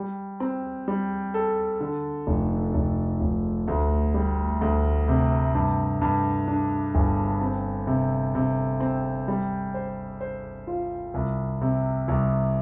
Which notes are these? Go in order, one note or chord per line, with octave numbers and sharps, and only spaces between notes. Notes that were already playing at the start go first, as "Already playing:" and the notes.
Already playing: G3
C4
G3
A4
D3
F1
F1
F1
D2
G3
D2
C3
G2
G2
D4
G1
C4
C3
C3
C4
G3
C5
C5
F4
C2
C3
C2